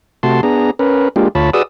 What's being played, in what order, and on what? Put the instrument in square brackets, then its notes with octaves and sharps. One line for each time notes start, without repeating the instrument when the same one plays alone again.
[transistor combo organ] C3 A3 F#4 A5 C6
B3 D4 G#4 A#5
C#4 A#4 B4
G#3 A#3 D4 F4 G4
D2 F4 C#5 A5 B5
F#4 G#4 B4 D5 D#6 E6